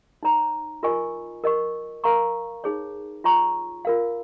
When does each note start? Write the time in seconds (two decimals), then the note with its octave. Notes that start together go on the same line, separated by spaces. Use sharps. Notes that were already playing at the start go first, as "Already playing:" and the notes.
0.23 D#4 C#5 A#5
0.83 F4 A#4 D#5 G#5 C#6
1.44 A#4 D#5 C#6
2.04 A#4 F5 A#5 C#6
2.64 D#4 G#4 C#5
3.24 F4 C#5 A#5 C#6
3.85 F4 A#4 F5